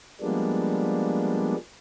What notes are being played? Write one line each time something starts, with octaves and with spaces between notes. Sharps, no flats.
F3 G3 G#3 A#3 B3 D4